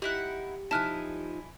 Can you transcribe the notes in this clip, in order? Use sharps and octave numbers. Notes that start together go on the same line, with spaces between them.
D#4 E4 G4 F#5
F3 D#4 E4 G#5 A5 F6 F#6